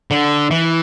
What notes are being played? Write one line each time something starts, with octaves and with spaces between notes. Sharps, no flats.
D3
E3